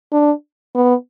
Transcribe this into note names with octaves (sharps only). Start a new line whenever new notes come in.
D4
B3